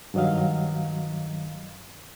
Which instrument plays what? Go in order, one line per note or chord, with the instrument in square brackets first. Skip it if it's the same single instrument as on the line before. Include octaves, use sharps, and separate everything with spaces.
[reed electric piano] G2 D#3 F#3 D#5 F5